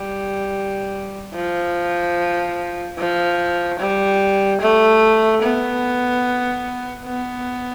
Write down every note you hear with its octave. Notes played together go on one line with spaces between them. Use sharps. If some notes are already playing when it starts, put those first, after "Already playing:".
Already playing: G3
F3
F3
G3
A3
B3
B3